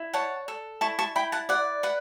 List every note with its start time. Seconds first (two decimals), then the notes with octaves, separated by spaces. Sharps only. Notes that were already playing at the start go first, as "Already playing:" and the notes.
Already playing: E4
0.13 C#5 F#5 A5
0.48 A4
0.81 E4 A5 C#6
0.99 A5 C#6
1.16 E4 G5 B5
1.32 F#5 A5
1.49 D5 F#5
1.83 B4 F#5